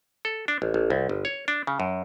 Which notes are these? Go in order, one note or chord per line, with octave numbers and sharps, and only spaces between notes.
A4
D4
A1
A1
C2
G1
C#5
D4
C#3
F#2